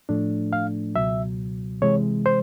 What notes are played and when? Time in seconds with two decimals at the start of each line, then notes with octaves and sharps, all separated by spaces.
0.09 A2 F3 A3 D4
0.53 F5
0.95 C#2 B2 F#3 E5
1.82 C3 E3 G#3 C#5
2.26 C5